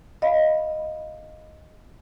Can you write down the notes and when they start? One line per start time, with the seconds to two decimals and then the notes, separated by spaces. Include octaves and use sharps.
0.22 D#5 F5 B5